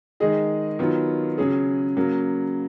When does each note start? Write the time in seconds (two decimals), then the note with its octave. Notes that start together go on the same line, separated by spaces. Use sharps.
0.20 D#3 G#3 D#4 G#4 D#5
0.79 D#3 F#3 B3 F4
1.38 C#3 F#3 C#4 G#4
1.97 C#3 F#3 A#3